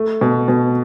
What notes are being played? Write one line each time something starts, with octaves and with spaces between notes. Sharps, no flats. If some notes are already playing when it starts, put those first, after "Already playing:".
Already playing: A3
B2
B2